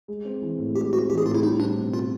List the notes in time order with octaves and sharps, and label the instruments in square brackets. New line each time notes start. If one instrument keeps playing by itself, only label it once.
[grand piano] G#3
C4
E3
A2
[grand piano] G#3 [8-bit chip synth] G4
[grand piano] C4 [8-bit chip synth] F#4
[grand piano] E3 [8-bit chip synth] G4
[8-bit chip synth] G#4
[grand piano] A2 [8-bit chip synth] F4
[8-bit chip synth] E4
[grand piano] G3 [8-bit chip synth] D#4
[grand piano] C4 [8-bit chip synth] D4
[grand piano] B2
[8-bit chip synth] F4